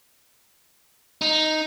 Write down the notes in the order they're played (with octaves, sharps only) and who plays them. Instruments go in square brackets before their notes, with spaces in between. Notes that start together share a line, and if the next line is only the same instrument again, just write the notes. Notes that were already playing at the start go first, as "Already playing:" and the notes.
[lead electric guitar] D#4